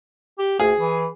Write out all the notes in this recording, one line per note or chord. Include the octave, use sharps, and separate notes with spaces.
G4
D2 G#4
E3